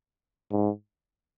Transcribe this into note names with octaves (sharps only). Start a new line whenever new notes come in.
G#2